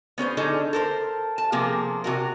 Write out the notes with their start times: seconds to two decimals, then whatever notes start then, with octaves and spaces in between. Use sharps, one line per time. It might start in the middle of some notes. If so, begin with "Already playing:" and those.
0.18 B3 C#4 A#4 C5
0.37 D3 C#4 D#4 G#4 A4
0.73 A4 A#4 C5
1.38 A5
1.52 C3 F3 A#3 G#4
2.04 C3 F#4 A#4